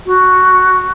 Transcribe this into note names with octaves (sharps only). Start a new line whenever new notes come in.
F#4